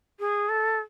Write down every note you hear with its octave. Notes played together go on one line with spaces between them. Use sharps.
G#4
A4